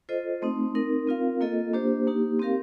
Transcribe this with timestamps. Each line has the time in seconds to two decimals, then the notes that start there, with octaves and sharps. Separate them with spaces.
0.09 F4 A4 C5 D#5
0.42 A3 C4 D#4
0.75 C4 D#4 A#4
1.07 C4 F4 A#4 F5
1.41 A#3 F4 A4 D#5
1.73 A#3 D4 G4 C5
2.07 A#3 D#4 G4
2.40 C4 G4 A#4 F5